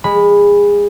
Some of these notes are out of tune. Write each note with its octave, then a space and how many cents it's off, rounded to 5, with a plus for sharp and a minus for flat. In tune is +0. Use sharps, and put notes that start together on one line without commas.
G#3 -25 B5 +0